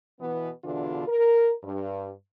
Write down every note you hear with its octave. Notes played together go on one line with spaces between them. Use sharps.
B2 E3 B3
E2 B2 D3 E3 D4 F4
A#4
G2